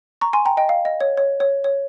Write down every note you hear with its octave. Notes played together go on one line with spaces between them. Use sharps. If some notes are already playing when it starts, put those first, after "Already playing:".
A#5 C#6
G#5 C6
G5 A#5
D#5 G5
F5
D#5
C#5
C#5
C#5
C#5